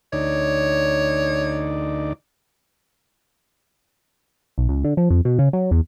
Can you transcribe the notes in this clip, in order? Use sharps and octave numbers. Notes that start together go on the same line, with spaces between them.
D2 D#4 C#5 D5
B1
C#2
D3
F3
F2
B2
C#3
F#3
E2